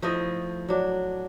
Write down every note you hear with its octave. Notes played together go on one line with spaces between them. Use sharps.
F3 A3 E4 D#5
F#3 D4